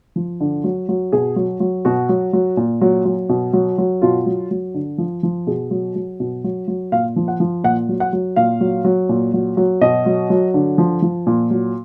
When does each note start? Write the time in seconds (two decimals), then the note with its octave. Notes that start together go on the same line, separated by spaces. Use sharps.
0.16 F3
0.40 D3
0.64 F#3
0.89 F#3
1.12 B2 G#4
1.36 F#3
1.60 F#3
1.85 B2 F#4
2.09 F#3
2.33 F#3
2.57 A#2
2.81 F#3
3.05 F#3
3.29 B2
3.53 F#3
3.78 F#3
4.02 B2 F4
4.26 F#3
4.51 F#3
4.74 D3
4.98 F3
5.23 F3
5.47 B2 G#4
5.71 F#3
5.95 F#3
6.20 B2
6.44 F#3
6.68 F#3
6.92 A#2 F5
7.16 F3
7.28 F#5
7.40 F3
7.64 A#2 F#5
7.89 F#3
8.00 F#5
8.13 F#3
8.36 A#2 F5
8.61 F#3
8.84 F#3
9.09 A#2
9.34 F#3
9.57 F#3
9.81 B2 D#5
10.06 F#3
10.30 F#3
10.54 D3
10.78 F3
11.02 F3
11.27 A#2
11.51 F#3